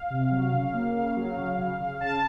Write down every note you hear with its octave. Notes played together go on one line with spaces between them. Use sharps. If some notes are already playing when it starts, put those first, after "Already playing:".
Already playing: F5
C3
F#3
C#3
A#3
C#3
F#3
C#3
C#3
C#3
C#3 A5